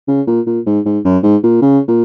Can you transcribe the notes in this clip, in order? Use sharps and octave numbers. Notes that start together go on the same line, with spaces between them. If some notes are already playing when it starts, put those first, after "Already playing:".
C#3
A#2
A#2
G#2
G#2
F#2
G#2
A#2
C#3
A#2